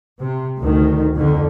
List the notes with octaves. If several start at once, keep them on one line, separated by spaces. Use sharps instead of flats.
C3
D2 D#3
F2 D3